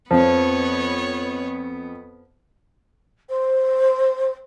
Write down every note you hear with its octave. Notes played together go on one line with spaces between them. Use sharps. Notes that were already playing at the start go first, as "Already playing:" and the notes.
F2 F3 B3 B4 C#5
C5